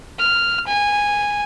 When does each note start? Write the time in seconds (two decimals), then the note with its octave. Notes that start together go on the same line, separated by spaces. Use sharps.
0.19 F6
0.67 G#5